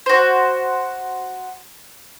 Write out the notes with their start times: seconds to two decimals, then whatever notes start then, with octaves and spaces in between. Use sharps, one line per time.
0.06 F#4 C5